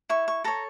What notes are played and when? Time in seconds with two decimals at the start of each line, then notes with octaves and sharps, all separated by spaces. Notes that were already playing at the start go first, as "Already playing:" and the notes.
0.09 E4 C#6
0.28 C#6
0.44 A4 C#5 A#5